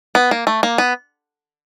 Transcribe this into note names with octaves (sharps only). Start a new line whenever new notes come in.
B3
A#3
A3
A#3
B3